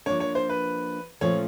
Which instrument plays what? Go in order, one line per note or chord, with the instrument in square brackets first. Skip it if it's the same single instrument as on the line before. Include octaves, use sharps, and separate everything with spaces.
[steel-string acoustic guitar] F3 A#3 D4 [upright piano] C#5
[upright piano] C#5
C5
B4
[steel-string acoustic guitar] A#2 F3 A3 C#4 [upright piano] C#5